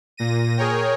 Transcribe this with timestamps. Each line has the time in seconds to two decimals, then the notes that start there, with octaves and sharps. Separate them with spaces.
0.17 A#2 A#6 D#7
0.57 G#4 A#4 C#5 G5